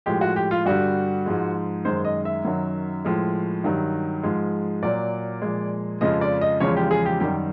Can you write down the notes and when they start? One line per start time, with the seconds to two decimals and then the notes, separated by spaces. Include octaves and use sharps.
0.06 A2 F3 G#3 G4
0.21 F#4
0.36 G4
0.51 F4
0.65 G2 D3 G3 F#4
1.26 G#2 F3 G#3
1.85 F#2 D#3 G#3 C5
2.05 D#5
2.25 E5
2.45 F#2 D#3 F#3
3.05 A2 F3 G#3
3.64 G2 D#3 F#3
4.23 G#2 F3 G#3
4.83 A#2 F#3 D5
5.42 A#2 F3 G#3
6.01 F2 C#3 F3 G#3 D#5
6.21 D5
6.41 D#5
6.60 E2 C#3 F3 G#3 C#5
6.76 G4
6.91 G#4
7.05 G4
7.20 F#2 D#3 G3 G4